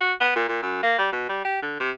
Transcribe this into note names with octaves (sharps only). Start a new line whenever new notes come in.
F#4
B3
A#2
A#2
F#2
A#3
G3
B2
G3
G4
D3
C3